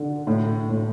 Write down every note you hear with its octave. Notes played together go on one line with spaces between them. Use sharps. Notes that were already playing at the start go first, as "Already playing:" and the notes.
Already playing: D3 D4
A2
A2